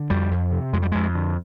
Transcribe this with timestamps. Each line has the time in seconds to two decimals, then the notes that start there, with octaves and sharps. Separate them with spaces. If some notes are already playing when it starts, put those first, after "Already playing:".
Already playing: D3
0.10 F2 G3
0.31 F2
0.52 C3
0.73 F2 G#3
0.82 G3
0.92 F2 G#3
1.15 D3